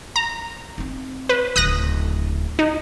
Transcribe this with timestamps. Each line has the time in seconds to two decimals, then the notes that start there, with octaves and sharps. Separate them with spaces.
0.16 A#5
0.78 C4 D#4
1.29 B4
1.56 D1 C#3 D#6 F#6 A#6
2.59 D#4